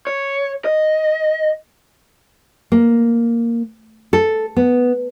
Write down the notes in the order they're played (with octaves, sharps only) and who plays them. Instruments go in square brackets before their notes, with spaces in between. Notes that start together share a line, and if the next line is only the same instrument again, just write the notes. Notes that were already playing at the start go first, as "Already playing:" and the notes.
[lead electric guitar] C#5
D#5
[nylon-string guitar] A#3
A4
B3